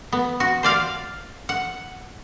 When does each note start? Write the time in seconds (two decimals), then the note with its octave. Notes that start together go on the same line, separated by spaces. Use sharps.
0.13 B3
0.40 F#4
0.63 C5 D5 F5
1.49 F#5